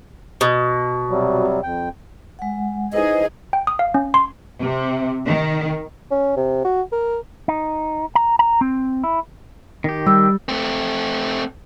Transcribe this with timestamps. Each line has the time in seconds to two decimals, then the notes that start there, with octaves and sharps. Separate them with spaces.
0.41 B2
1.10 C3 F#3 G3
1.63 F2 G5
2.39 G#3 F#5
2.93 D#4 E4 G#4 B4 C5 D#5
3.53 G5
3.67 D#6
3.79 F5
3.94 C#4
4.14 C6
4.60 C3
5.26 D#3
6.11 C#4
6.36 C3
6.64 F#4
6.92 A#4
7.48 D#4
8.15 A#5
8.39 A#5
8.61 C4
9.04 E4
9.84 D#3 G4
10.06 G3 E6
10.49 A3 C4